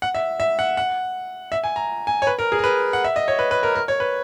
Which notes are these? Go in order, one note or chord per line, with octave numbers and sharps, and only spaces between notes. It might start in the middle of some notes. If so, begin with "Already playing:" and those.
F#5
E5
E5
F#5
F#5
E5
G#5
A#5
G#5
C#5
B4
A#4
G#4
A#4
B4
F#5
E5
D#5
C#5
B4
B4
A#4
A#4
C#5
B4